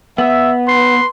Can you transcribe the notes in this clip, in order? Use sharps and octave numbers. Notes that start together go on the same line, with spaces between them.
B3 E5
B4 C6